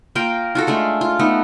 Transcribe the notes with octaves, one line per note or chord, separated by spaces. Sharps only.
A#3 F4 A#4 G5
F4 F#4 A4
G#3 A3 D4 F4
F4
A3 B3 D#4